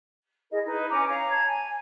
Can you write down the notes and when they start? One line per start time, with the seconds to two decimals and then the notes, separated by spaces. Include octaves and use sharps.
0.50 E4 G#4 A#4 D#5
0.64 D#4 E4 B4
0.90 C#4 G#5 A#5 D6
1.07 C#5 F5 A#5
1.30 A5 A#5 G#6
1.46 G#5